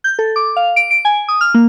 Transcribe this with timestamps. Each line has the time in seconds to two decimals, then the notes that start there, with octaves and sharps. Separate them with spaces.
0.04 G6
0.19 A4
0.36 D6
0.56 F5
0.76 D7
0.91 D7
1.05 G#5
1.28 D#6
1.41 F6
1.54 A#3